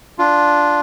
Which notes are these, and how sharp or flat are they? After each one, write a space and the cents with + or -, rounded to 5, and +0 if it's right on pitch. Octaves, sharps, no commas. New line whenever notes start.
D4 -5 F4 +0